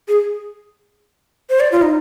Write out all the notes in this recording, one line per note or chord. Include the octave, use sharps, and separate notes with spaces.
G#4
C5
D5
F4
D#4